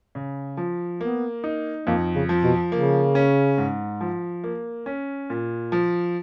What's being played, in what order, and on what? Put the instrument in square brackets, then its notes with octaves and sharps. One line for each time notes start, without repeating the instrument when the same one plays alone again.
[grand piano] C#3
F3
[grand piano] A#3 [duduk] B3
[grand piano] D#4
[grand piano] F2 [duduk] A#3
[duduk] C#3
[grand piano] F3
[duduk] B2
[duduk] C#3 [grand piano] A#3
[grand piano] C#4
G#2
F3
A#3
C#4
A#2
F3